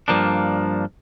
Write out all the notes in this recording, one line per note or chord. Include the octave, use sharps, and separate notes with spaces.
G2 F3 A#3 D4